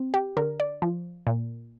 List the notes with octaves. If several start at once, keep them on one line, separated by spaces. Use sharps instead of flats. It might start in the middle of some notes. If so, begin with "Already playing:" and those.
Already playing: C4
G4
D3 A#4
D5
F3
A#2